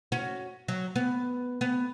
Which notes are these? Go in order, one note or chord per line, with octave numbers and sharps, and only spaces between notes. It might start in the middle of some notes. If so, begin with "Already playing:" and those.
C#4 F#4
F#3
B3
B3